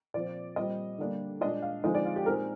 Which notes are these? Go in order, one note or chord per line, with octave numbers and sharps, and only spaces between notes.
A#2 F3 C4 D5
A#2 G3 C4 D#5
D3 G3 A#3 D4
A#2 G#3 D4 D#5
F5
D3 F3 G#3 C4 D#4 D#5
D5
F4
G4
A#2 G#3 C4 D#4 A#4